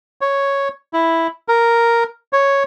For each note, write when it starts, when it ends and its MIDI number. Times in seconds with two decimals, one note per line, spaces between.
0.21 0.69 73
0.93 1.27 64
1.48 2.04 70
2.33 2.63 73